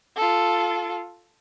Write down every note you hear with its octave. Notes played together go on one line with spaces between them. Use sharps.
F4 A4